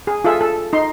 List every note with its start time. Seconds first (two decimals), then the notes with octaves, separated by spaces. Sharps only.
0.07 G#4
0.24 F4 G#4 A4 E5
0.41 A4
0.73 D#4 C6